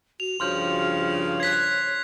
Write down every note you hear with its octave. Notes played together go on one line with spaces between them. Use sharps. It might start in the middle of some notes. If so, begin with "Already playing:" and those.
F#4 F7
G2 C#3 F3 F#4 C6 F6 G6
C#5 F#6 G#6 B6 C7